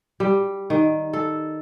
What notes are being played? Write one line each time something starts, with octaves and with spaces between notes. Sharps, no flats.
G3
D#3
A4